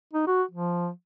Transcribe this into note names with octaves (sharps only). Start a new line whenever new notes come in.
D#4
F#4
F3